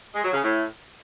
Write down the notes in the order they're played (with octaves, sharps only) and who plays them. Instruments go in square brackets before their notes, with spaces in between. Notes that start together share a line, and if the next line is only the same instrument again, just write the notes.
[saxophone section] G#3
F#3
C#3
A2